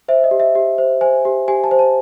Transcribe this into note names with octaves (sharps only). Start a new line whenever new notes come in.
C5 E5
D#5
G4
E5
G4
C5
C5 G#5
G4
G4 G#5
A5
C5
A5